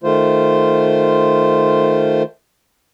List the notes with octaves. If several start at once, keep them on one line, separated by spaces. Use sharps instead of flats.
D#3 A3 F4 C5